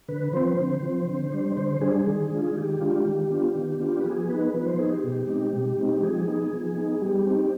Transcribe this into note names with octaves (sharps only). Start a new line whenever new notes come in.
D3 B4
F3 C4 C5
D3
F3 C4
D3
G3 D4
D3 C5
G3 D4 G#4
D#3 G#4
G#3 D4 F4
D#3 G4
G#3 D4 F4
D#3
B3 D4 F4
D#3
B3 D4 F4
B4
F3 G#4
B3 D#4 B4
F3 B4
C5
B3 D#4 G#4
G4
B2
G#3 C4 D#4
B2
G#3 C4 D#4
F3 G#4
B3 D#4
F3
B3 D#4
G3 G4
C4 D#4